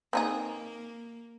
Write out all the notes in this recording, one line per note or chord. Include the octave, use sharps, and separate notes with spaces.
A#3 C4 D#4 G#4